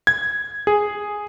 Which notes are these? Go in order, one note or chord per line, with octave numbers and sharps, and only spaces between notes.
G#6
G#4